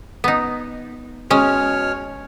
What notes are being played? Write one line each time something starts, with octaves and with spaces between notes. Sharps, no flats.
B3 D#4
B2 G#3 C#4 C#5 F6